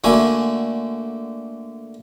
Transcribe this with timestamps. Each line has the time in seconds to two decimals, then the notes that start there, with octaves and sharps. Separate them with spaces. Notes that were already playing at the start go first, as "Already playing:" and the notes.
0.04 D3 A3 A#3 F#4 G#5